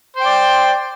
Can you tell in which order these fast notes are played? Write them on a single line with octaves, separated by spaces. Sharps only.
C5 G5 D5